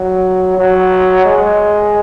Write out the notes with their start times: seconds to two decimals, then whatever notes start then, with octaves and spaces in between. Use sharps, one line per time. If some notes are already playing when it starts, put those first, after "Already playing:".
Already playing: F#3
0.58 F#3
1.25 G#3